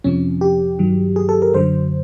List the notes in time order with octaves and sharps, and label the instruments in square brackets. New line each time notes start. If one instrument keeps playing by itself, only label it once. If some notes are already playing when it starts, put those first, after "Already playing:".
[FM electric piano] F2 C3 F3 C#4
G4
G2 D#3 F#3
G#4
A4
A#4
F#2 D3 F#3 C5